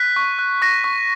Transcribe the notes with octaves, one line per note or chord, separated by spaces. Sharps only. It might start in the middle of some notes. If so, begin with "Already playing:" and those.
Already playing: F#6 B6
C#6
F#6
C#6 A#6
C#6